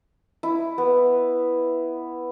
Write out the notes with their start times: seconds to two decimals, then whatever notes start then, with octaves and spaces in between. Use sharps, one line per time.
0.43 E4
0.78 B3